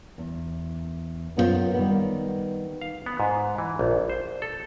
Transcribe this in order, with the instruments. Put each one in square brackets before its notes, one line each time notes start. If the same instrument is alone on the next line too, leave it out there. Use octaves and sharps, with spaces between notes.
[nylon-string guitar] E2
F#2 B3 E4 F4 C5
D#3 G3 B3
[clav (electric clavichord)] F5
B3
G#2
E3
A#1
C5
A4